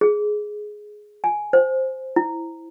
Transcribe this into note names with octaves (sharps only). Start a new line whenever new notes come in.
G#4
G#5
C5
E4